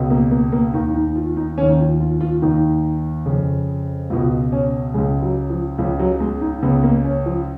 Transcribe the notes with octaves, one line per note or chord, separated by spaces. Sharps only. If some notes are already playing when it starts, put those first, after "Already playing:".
Already playing: C#2 B2
A#3
A#3
A#3
D#2 D#3 D#4
D#4
F4
D#4
D#2 D#3 C#4
D#4
F4
F4
F4
D#2 D#3 D#4
F2 C#3
C#2 B2 F4
C#4
C#2 C#3 G#3
F#3
F3
C#2 C#3 F3
F#3
G#3
D#4
C#2 C#3 B3
A#3
C#4
F3